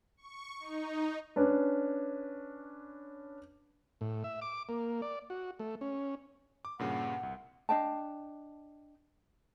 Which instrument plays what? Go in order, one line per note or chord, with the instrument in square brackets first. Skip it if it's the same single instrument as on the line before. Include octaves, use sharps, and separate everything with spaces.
[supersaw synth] C#6
D#4
[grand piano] C#4 D4 B4
[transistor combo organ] A2
E5
D6
A#3
D5
F#4
A3
C#4
[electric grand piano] D6
[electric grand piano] G2 A#2 C#3 [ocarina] F#5
[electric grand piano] C2
[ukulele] D4 D#5 G5 A5